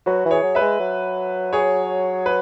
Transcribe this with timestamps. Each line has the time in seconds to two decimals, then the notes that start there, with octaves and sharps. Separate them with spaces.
0.06 F#3 F#4 B4
0.25 E3
0.31 G#4 C#5
0.43 F#3
0.55 B4 E5
0.61 G#3
0.80 F#3
1.53 G#4 C#5
2.26 B4